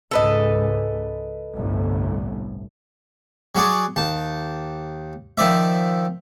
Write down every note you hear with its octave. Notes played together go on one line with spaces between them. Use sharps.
C#2 G#2 A4 B4 D#5
G1 C2 A2
F#3 F#4 G#4 D5
D#2 A5
D#3 F3 D5 E5